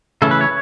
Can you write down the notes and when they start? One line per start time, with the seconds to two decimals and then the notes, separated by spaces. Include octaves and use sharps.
0.22 C#3 E3 A3 C#4 A4
0.31 B4
0.41 C#5